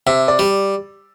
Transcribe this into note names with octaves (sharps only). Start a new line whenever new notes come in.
C3 E5
D5
G3